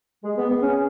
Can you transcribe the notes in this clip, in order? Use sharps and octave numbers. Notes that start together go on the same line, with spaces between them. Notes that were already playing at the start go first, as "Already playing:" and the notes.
G#3 G#4
B3
B3
C#4